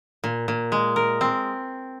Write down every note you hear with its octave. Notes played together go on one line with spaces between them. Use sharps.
A#2
A#2
G#3
A#4
C4